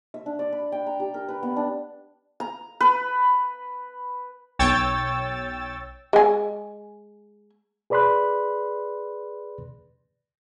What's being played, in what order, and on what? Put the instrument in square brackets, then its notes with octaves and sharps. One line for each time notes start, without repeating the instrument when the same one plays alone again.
[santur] E5
D4
D5
B5
G5
A#5
G4
A#4
B4
B3
D4
A#5
B4
[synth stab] B1 C#5 G5 E6 A6
[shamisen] G#3 G#5
[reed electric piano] G#4 B4 D5 B5 C6 F#6